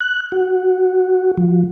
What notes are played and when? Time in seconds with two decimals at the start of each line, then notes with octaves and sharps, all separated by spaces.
0.01 F#6
0.32 F#4
1.37 F3